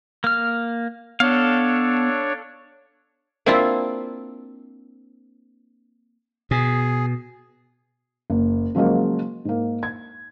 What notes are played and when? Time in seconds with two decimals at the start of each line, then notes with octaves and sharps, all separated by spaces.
0.24 A#3 F6
1.20 B3 D4 A4 C#5 F5
3.46 A#3 C4 D4 E4 F4
6.51 B2 G#4
8.30 F#1
8.75 C#3 F3 F#3 G#3 A#3
9.45 G#2 A#3
9.83 G#6